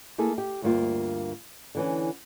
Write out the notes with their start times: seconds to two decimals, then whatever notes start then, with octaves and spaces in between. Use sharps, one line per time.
0.18 A#3 E4 G#4 A4
0.38 G4
0.62 D2 G2 A#3 F4
1.75 D3 E3 C#4